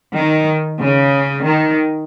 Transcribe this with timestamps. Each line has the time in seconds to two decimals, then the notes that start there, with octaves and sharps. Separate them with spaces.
0.14 D#3
0.80 C#3
1.45 D#3